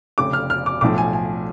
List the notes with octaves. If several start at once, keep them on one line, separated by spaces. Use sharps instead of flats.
F1 F2 C#3 D6
F6
F6
D6
B1 A2 F3 D6
G#5
G#5